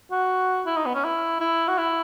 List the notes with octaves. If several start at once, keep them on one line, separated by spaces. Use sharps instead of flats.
F#4
E4
D#4
B3
C#4
E4
E4
F#4
E4